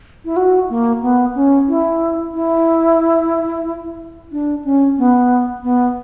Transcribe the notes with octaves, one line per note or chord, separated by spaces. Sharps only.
E4
F#4
A#3
B3
C#4
E4
E4
D4
C#4
B3
B3